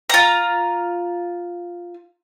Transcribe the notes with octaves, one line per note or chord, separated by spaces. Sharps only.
F4 A#5